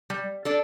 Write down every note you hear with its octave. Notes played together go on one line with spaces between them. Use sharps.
G3
D4 A4 D5